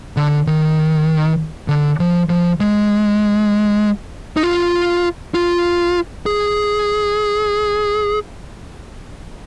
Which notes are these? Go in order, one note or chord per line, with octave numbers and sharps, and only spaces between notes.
D3
D#3
D3
F3
F3
G#3
D#4
F4
F4
G#4